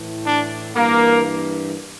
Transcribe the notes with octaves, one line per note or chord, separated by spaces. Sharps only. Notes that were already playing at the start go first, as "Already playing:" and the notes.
Already playing: A2 E3
D4
G2 E3 A#3